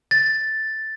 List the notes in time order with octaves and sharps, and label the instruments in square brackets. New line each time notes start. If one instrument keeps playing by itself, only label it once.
[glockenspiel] A6